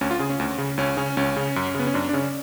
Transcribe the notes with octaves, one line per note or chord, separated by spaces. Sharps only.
D2 C#4
F4
C#3 G#4
C#4
D2
C#3
C#2 C#4
C#3 C#4
C#2 C#4
C#3
F#2
C#3 B3
C#4
F#2 D4
D4
C#3 C#4